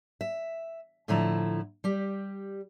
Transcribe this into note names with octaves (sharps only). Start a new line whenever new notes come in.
E5
A2 D3 F3 A3 E4 A#5
G3 G4